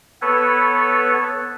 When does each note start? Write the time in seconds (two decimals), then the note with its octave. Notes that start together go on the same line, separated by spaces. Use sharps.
0.22 B3 A4 B4 C#5